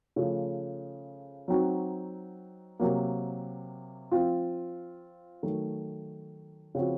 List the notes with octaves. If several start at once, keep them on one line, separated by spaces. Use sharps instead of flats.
C#3 F3 A3
F#3 C4 D#4 F#4
C3 F#3 A#3
F3 C4 F4
D#3 F#3 A3
C#3 F3 C4 F#4